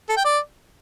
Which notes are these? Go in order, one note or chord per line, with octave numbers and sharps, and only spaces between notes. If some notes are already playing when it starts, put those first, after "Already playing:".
A4
G5
D5